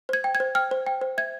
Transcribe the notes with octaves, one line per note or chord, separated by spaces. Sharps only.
C5 G#6
G5
G#6
C5
G5 F6
C5
G5
C5
E5 G#6